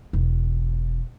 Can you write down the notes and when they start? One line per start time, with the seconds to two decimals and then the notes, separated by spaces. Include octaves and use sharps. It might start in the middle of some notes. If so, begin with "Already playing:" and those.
0.13 E1